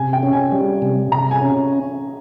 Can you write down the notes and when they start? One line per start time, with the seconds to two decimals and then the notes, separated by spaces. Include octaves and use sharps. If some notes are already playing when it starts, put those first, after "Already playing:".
Already playing: C3 G#5
0.13 G5
0.23 C#4
0.33 G#5
0.52 G3
0.82 C3
1.12 C3 A#5
1.31 G#5
1.41 C#4